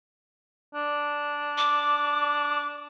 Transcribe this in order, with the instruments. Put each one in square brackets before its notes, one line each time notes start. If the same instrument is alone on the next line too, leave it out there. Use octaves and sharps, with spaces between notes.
[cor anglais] D4
[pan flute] D6